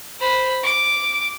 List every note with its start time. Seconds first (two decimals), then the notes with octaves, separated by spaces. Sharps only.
0.20 C5 B5
0.63 D6